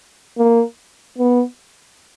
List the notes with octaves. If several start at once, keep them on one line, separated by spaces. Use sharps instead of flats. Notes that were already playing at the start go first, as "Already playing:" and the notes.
A#3
B3